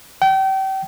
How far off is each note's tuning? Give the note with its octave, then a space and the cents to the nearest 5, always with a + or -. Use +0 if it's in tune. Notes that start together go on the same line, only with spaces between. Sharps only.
G5 -30